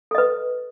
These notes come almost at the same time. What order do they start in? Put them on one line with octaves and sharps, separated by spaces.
A4 D#5 B4